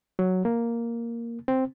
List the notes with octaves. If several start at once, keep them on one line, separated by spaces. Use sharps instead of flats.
F#3
A#3
C4